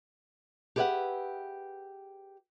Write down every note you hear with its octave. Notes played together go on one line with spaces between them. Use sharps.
G4 G#4 B4 D5 E5 F#5